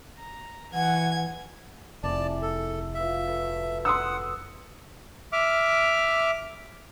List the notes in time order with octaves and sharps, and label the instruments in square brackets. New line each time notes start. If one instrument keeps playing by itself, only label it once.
[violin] A#5
[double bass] E3 [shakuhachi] F#5 [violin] G#5 G#6
[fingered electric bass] F1 [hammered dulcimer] E4 G#4 [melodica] D5 A5
[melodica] A4
[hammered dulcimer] F4 F#4 B4 [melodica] E5
[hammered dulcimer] A4 B4 C#5
[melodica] F#5 [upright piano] C6 D#6 E6
[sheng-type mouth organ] E5 D6 F6